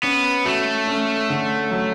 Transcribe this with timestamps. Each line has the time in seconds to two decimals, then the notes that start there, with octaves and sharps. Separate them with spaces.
0.03 B3 C#4
0.45 A3 F#4
0.87 C#4
1.30 D3
1.71 F#3